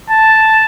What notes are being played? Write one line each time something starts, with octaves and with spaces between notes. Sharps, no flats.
A5